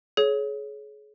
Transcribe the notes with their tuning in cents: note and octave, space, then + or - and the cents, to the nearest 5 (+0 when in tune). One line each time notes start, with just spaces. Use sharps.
G#4 +35 C#5 +0